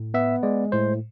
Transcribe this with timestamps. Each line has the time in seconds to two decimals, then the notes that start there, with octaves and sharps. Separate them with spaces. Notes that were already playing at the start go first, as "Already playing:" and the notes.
Already playing: A2
0.14 B3 E5
0.43 G#3 D5
0.72 A2 C5